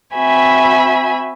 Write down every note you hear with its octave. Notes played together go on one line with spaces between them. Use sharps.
C4 F#4 E5 G#5 B5